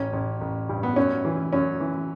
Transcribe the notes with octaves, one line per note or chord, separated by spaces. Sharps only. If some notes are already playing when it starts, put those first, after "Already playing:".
Already playing: A1 C#4
A1
A1
G2
B3
F#2 C#4
E3
F#2 C#4
E3